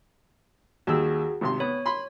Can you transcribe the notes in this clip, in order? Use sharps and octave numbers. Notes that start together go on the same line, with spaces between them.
D#2 G3 F#4 G#4 E6
G#1 C3 C6
B3 C#5
B5 C6